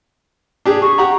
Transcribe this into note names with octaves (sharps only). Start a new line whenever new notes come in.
D4 G4 G#4
G#4 C#6
G4 F#5 A#5